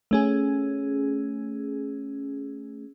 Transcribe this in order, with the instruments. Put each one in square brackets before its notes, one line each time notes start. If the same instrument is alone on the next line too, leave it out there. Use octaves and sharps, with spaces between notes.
[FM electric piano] A3 C#4 G#4